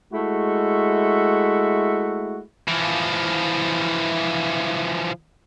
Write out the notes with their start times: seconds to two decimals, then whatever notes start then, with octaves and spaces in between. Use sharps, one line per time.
0.12 G#3 A3 E4 F#4
2.68 E3 F3